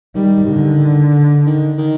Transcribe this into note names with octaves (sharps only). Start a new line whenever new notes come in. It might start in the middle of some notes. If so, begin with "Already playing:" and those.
D#3 G3
D3
D#3
D#3